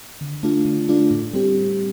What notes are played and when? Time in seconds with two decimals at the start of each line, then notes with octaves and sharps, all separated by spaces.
0.21 D3
0.43 A3 D4 F4
0.65 D3
0.89 A3 D4 F4
1.11 A2
1.33 G3 C4 G4